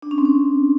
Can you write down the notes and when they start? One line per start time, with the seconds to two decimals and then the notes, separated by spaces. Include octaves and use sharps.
0.02 D4
0.11 C#4
0.18 C4
0.25 C#4